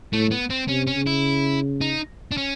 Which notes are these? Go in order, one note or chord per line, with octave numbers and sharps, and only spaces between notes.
A2 A3
B3
C4
C3 C#4
C#4
C#3
E4
D#4
D4
C#4